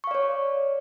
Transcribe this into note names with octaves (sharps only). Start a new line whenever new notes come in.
C#5 D5 F5 C#6